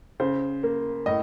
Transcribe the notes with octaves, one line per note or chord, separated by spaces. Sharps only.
C#3 C5
A#3
A2 D#5